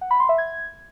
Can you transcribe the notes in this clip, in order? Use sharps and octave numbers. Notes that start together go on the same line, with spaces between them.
F#5
B5
C6
E5
G#6